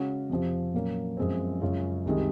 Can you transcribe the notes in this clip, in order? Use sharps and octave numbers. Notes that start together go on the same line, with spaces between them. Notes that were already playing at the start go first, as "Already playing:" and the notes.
Already playing: C#3 G#3 C#4 F#4
F2 C3 F3 C4
A#2 F#3 A#3 C#4
F#2 F3 G#3 C4
F#2 C#3 G#3 C#4 F4
C2 C3 D#3 G#3